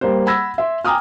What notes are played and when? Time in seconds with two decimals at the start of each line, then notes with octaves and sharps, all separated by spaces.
0.01 G3 A#3 C5
0.26 F#5 B5 E6 G#6 A#6
0.58 E5 C6
0.85 G5 G#5 A#5 D6 D#6 F6